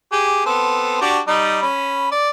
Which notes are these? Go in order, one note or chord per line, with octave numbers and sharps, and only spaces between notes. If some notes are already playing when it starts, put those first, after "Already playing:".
G4 G#4
B3 C4 A4
D4 F#4 G4
G3 D#4
C#4 B5
D5